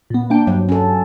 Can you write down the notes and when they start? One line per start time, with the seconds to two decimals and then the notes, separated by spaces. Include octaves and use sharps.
0.10 A#2 B3
0.30 A#3 D4 G5
0.47 G2 F#3
0.69 C#4 A4